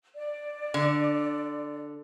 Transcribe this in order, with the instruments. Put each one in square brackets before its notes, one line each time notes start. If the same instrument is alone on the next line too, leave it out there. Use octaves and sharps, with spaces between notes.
[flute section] D5
[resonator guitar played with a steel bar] D3